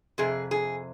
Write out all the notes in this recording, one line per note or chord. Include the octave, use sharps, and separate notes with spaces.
F2 C3 G#4
G#4